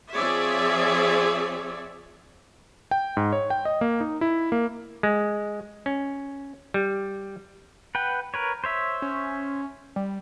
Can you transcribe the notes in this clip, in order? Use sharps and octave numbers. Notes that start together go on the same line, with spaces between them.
F3 C4 G#4 C#5 D5 E5
G5
G#2
C#5
G5
D#5
A#3
D#4
E4
A#3
G#3
C#4
G3
B4 F#5 G5
A#4 B4 C#5
C5 C#5 E5
C#4
G3